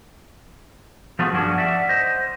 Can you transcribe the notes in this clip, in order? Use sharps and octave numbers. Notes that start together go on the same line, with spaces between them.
F3 A3 B3 F4 F#4 G#4
G2 F3 C#4 D4 F#4 G#4
D5 E5 F#5
C5 D#5